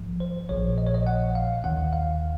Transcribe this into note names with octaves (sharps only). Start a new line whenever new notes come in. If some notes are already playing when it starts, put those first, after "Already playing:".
Already playing: A#1 G#2 F3
C5
A#1 A#2 F3 C#5
D#5
C#5
D#5
F#5
F5
D#2 D#3 F#5
F5